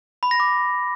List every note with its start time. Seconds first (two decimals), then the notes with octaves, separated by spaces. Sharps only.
0.23 B5
0.31 A#6
0.40 D6